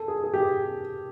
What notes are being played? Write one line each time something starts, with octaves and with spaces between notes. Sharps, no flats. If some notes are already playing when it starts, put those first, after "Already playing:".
Already playing: A4
G#4
G#4
G4
G#4